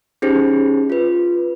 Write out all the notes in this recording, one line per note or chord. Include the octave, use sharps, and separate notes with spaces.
C#4 D#4 G4 G#4 C5
F4 B4